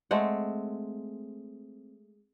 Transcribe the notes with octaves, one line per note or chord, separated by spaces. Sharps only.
G#3 A3 C4 F#5